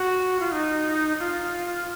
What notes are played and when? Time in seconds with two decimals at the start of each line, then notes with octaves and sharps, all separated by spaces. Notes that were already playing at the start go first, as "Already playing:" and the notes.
Already playing: F#4
0.40 F4
0.52 D#4
1.20 F4